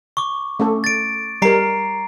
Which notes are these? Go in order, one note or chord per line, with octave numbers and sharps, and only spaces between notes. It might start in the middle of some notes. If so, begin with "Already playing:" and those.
C#6 D6
A3 C#4 A4
A6 D7
G3 A#4 A#5 C7 D7